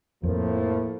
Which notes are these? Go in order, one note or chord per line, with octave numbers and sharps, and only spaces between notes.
F2 A2 F3 A#3